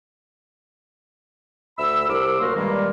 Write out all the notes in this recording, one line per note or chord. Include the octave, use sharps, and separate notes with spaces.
D2 E5 B5 E6
C2 C3 A#4 D6 E6
D2 F#3 A#3 F#4 A#4 C6
G2 A#2 D#3 G3 G#3 A#3